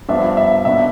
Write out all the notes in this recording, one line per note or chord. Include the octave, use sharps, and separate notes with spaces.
G2 F3 B3 D4 E5
E5
B2 B3 D4 E5